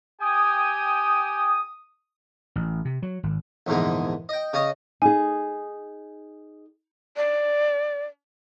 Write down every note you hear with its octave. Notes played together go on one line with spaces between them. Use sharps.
G4 G5 G#5 D#6
A1
C3
F#3
G#1
A#1 E2 G#2 D3 G#3
D#5 G5
C#3 C#4 C#5 D#5
D#4 G#4 G#5
D5